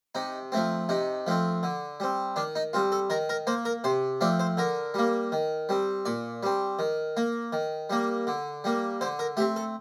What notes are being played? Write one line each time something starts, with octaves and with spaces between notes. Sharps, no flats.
C3 D#4
F3 A3 C4
C3 D#4
F3 A3 C4
D3
G3 C4
D#3 D4
D#4
G3 C4 F4
A4
D#3 A#4
A#4
A#3 C5
A#4
C3 C5
F3 A3 C4 D5
C5
D3 A#4
G3 A#3
D#3
G3 C4
A#2 D5
G3 C4
D#3
A#3
D#3
G3 A#3
D3
G3 A#3
D3 C5
A#4
A3 C4 G4
A4